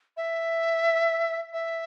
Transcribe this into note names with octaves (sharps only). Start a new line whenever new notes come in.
E5
E5